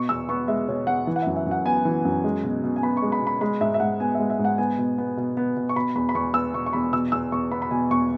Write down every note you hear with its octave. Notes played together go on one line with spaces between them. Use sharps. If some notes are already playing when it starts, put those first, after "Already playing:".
Already playing: B2 C#6
E2 E6
B3 C#6
G#3 E5
B2 C#5
E2 F#5
E3
F#5
F#2 E5
E5
F#2 F#5
B3 G#5
E3
F#2
G#3
B2
B2
G#5
B3 B5
C#6
G#3
B5
B2
B5
G#3 B5
G#2 E5
E5
G#2 F#5
B3 G#5
G#3 E5
E5
G#2
F#5
B3 G#5
B2
B3
B2
B3
B2
C#6
B2 B5
E2 B5
B5
E2 C#6
B3 E6
B2 C#6
C#6
E2 B5
B2 E6
E2 E6
E2 C#6
B3 B5
B5
B2 G#5
E2 C#6